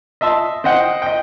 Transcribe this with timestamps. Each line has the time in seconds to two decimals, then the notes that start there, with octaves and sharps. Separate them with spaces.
0.21 D#5 E5 A5 C6
0.64 C4 C5 D#5 F#5 G5
1.02 D#5 G5